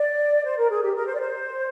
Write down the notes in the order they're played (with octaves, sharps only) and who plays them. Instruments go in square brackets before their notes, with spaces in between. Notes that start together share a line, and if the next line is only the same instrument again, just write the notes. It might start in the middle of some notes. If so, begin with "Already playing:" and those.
Already playing: [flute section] D5
C5
A#4
G#4
G4
A#4
C5
D5
C5